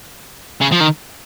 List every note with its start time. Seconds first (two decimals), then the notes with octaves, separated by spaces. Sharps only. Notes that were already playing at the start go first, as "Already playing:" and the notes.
0.61 C#3
0.72 F3
0.80 D#3